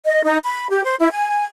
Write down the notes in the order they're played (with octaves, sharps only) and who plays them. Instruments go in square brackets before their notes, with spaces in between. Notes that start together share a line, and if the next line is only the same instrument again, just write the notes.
[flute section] D#5
D#4
B5
G4
C5
E4
G#5